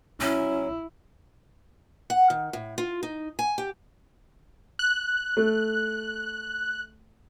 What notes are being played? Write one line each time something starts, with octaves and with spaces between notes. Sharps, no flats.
F#3 C#4 E4
F#5
D#3
A2
F4
D#4
G#5
G4
F#6
A3